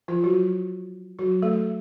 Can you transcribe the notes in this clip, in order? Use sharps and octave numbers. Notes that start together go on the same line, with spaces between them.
F3 F4
F#3 F#4
F#3 F#4
A3 A4